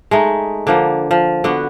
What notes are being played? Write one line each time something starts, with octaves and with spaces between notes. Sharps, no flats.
G#3 A3 D#4
D3 F3 A#3
F3
D3 B3 F#4